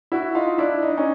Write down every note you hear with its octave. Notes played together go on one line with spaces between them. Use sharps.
E4 F#4
D#4 F4
D4 E4
D#4
D4
C#4 D#4